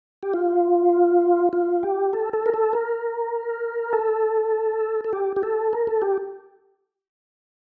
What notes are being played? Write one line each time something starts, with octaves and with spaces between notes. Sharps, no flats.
G4
F4
F4
G4
A4
A4
A#4
A4
A#4
A4
A4
G4
G4
A4
A#4
A4
G4